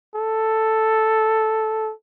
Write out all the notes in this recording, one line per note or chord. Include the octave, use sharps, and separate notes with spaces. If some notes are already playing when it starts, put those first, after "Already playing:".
A4